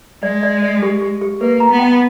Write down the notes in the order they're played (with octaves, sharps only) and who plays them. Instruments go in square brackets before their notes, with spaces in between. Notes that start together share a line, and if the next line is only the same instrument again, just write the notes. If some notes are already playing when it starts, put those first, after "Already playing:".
[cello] G#3 [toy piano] D5
[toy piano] D5
D5
G4
G4
G4
[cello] A#3 [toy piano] B4
[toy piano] A#5
[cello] B3
[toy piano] G5